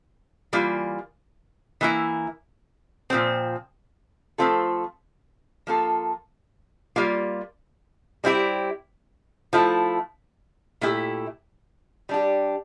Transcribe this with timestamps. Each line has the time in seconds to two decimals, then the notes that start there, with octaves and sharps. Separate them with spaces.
0.53 E3 G3 A#3 F4
1.81 E3 A#3 E4
3.10 A#2 F3 C4
4.38 F3 A3 C4 F4 A4
5.67 F3 A#3 F4 A4
6.96 G3 A#3 F4
8.24 G3 C4 E4 G4
9.53 F3 A3 E4
10.81 A#2 A3 E4 G4
12.09 G3 D4 G4